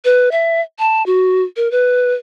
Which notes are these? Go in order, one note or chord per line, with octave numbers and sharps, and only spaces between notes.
B4
E5
A5
F#4
A#4
B4